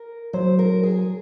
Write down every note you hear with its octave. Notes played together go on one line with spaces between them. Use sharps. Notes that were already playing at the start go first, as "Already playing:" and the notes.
Already playing: A#4
F#3 C5
A#4
G#4